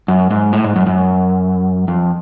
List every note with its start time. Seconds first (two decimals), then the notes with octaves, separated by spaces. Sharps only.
0.08 F#2
0.31 G#2
0.53 A2
0.64 G#2
0.76 F#2
0.87 F#2
1.88 F2